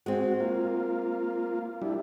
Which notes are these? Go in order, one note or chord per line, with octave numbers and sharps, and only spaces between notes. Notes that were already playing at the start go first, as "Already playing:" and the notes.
G#3 C4 F#4
A#3 F4
G3 D4 E4